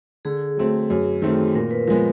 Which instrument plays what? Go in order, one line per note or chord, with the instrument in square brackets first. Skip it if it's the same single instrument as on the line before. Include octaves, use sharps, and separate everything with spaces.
[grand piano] D3 [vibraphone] G#4
[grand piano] F#3 A3 C4
[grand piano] F#2 [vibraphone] B4
[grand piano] D#3 F#3 A3 C4
[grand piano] A#2 [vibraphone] A#4
[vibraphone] B4
[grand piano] F3 G#3 B3 [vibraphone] A#4